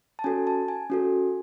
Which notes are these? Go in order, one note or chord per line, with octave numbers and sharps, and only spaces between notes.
A5
C#4 F#4 A4 G#5
A5
G#5
C#4 F#4 A4